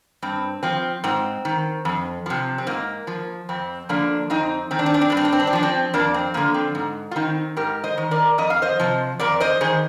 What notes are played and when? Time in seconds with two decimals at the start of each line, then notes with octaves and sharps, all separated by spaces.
0.22 G2 C4
0.63 F3 C4
1.04 G#2 C4
1.45 D#3
1.85 F2
2.26 C3 F3
2.58 C4
2.67 G#2 A#3
3.07 F3
3.49 F2 C4
3.89 D3 F3 A#3 D4
4.30 F2 C4 D#4
4.71 D#3 C4
4.79 D4
4.86 C4
4.94 D4
5.01 C4
5.10 G2 D4
5.17 C4
5.25 D4
5.33 C4
5.40 D4
5.47 C4
5.53 F3 D4
5.63 C4
5.94 F2 A#3 D4
6.14 C4
6.34 D3 F3 A#3
6.54 C4
6.75 G#2
7.11 F4
7.16 D#3 C4 D#4
7.57 G#2 G4 A#4
7.84 C5 D#5
7.98 D#3
8.11 A#4 D5
8.38 F2 D#5
8.50 F5
8.62 C5 D#5
8.80 C3 F3
9.19 F2 A#4 D5
9.40 C5 D#5
9.61 D#3 G#4 C5